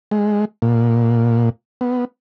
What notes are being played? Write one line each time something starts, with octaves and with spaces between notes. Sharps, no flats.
G#3
A#2
B3